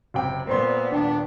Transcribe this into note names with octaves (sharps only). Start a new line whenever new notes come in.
F#1 C3 G5
A#2 B3 C4 A#4 C5 D5 C6
D#1 D4 G5